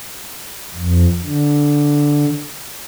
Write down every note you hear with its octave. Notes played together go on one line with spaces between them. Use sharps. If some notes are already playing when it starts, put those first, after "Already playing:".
F2
D3